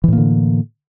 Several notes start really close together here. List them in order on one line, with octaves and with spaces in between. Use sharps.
E3 A2 A#3 D3